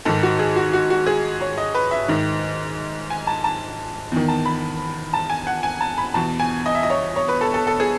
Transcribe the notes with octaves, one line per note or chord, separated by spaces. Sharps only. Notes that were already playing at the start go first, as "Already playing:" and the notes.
G#2 D#3 A4
F#4
G#4
F#4
F#4
F#4
G#4
C#5
D#5
B4
E5
G#2 D#3
G#5
A5
A5
E2 D#3
A5
B5
A5
G#5
F#5
G#5
A5
B5
E2 B2 A5
G#5
D#5
E5
D#5
C#5
C#5
B4
A4
A4
A4
G#4